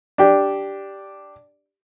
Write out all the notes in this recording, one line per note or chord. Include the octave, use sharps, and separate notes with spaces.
D4 G4